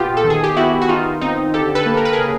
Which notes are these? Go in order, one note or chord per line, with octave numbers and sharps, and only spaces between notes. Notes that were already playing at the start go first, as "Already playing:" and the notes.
Already playing: A#2 B3 F4 G4
A4
D#3
G#4
G4
B3 E4 F#4
F#4
D#3 D#4 F4
C4 D#4
D3 G4 A4
A4 B4
A#3
A#4
B4
G#4 A#4
C#3